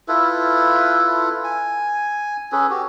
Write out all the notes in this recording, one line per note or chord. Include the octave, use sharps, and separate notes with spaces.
E4 F4 A4 B4
G#5
C#4 G#4 A4 B4
F#4 G4